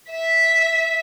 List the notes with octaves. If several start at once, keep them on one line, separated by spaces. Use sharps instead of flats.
E5 B6